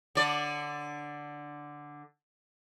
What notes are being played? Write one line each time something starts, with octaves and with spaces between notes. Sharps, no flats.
D3 D5